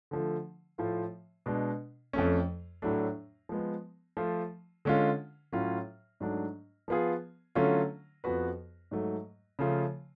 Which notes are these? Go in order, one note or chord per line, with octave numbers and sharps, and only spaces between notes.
D3 F3 A3
A2 F3 A3 F4
B2 G#3 D4
F2 F3 A3 C#4
A2 F#3 A3 D4
F3 G#3 B3
F3 A3 F4
D3 G#3 C#4 F4
A2 F#3 C#4 F4
G#2 F#3 A3 D4
F3 B3 F4 G#4
D3 F#3 A3 C#4 F4
F2 F3 B3 F#4 B4
G#2 F#3 A3
C#3 F3 A3 F4